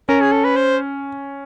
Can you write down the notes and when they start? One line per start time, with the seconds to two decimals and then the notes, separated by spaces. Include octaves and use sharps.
0.08 C#4 A#4
0.21 G#4
0.32 A4
0.44 B4
0.56 C5